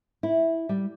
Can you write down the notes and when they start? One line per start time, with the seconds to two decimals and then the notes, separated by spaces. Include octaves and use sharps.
0.23 E4
0.69 G3